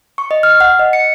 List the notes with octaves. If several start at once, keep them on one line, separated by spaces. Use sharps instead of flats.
C#6
D#5
F6
F#5
D#5
C#7